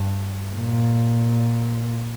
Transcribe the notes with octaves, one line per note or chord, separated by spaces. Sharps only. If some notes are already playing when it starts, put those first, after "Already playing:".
Already playing: G2
A#2